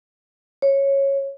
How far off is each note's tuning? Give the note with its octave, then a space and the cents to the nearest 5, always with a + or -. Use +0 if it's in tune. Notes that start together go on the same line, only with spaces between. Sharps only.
C#5 -10